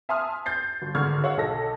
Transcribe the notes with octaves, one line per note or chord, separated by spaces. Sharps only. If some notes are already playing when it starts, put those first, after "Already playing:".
E5 G#5 A5 C6 D#6 F6
G6 A6 C7
G1
G#1 D3 C#6 F6 G#6
C#5 F5 F#5 E6
B1 D#4 A4 A#6